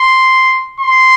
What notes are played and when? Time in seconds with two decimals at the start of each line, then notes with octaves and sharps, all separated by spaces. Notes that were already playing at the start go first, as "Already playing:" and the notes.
Already playing: C6
0.80 C6